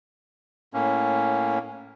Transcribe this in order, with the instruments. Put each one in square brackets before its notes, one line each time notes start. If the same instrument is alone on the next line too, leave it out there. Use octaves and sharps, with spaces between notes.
[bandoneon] A2 A#3 C#4